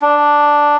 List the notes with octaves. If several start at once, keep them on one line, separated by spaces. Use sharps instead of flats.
D4